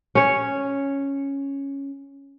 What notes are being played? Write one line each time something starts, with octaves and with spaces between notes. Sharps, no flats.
C#4 C#5